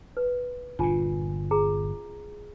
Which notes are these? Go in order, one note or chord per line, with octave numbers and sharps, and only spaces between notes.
B4
G1 A#2 D4 F4 G#5
G#4 A#5